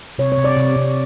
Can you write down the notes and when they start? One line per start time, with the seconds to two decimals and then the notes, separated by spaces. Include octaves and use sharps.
0.19 C3 C#5
0.32 C#5
0.38 C3
0.44 D5
0.57 C3
0.76 C3